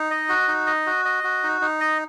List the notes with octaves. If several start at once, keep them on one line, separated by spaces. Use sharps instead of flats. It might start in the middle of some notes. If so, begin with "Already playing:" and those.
Already playing: D#4
D#5
F#4
D#4
D#5
F#4
D#5
F#4
D#4
D#4
D#5